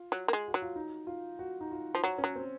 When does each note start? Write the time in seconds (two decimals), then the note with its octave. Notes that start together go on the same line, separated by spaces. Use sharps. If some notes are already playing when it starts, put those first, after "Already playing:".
Already playing: F4
0.12 F#3
0.28 A#3
0.33 G#3
0.48 F#4
0.54 F#3
0.62 F4
0.76 D#4
1.07 F4
1.39 F#4
1.61 D#4
1.72 F4
1.95 F3
2.04 F#3
2.18 C#4
2.24 F#3
2.35 C4